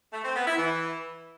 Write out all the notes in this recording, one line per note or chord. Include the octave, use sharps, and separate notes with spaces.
A3
C4
B3
E4
E3